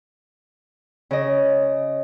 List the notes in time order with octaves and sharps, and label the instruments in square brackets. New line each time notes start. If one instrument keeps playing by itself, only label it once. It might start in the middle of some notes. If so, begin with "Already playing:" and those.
[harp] C#3 D#5